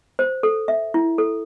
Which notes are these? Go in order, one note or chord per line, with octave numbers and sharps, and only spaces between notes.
C5
A4
E5
E4
A4